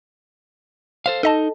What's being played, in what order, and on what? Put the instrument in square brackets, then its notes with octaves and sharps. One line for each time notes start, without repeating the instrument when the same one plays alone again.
[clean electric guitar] A4 C5 F5
[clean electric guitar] D#4 [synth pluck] A4 D#5 A5